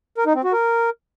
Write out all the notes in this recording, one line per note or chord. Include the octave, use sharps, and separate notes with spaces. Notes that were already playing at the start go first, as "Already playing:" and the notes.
A#4
D#4
C4
F#4
A#4